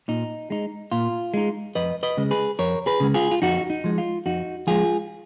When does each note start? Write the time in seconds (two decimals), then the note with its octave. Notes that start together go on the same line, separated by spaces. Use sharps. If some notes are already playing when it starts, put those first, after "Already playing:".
0.08 A#2 D#4
0.50 G#3 D#4
0.92 A#2 F4
1.34 G#3 D#4
1.75 F2 B4 D#5
2.03 B4 D#5
2.17 C#3 G#3
2.31 G#4 B4
2.59 F2 A#4 C#5
2.86 G#4 B4
3.00 C#3 G#3
3.14 F4 G#4
3.31 F4
3.42 F2 D#4 F#4
3.70 D#4
3.84 F3 G#3
3.98 F4
4.26 F2 D#4 F#4
4.67 F3 G#3 F4 G#4